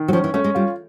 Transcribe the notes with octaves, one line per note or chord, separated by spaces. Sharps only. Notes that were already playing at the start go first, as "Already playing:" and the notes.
Already playing: D#3
F#3
F3 C#4
E3
A3 C#4
G#3
G3 F4